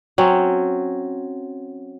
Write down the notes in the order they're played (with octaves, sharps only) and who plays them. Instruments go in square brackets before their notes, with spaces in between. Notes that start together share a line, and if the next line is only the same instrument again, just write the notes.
[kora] F#3 C4 C#4